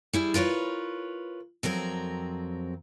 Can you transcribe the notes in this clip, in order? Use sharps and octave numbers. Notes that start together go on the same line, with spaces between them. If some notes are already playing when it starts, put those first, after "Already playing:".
G3 E4 G#4
F4 A#4 B4 C#5
F2 F#3 C4 A#4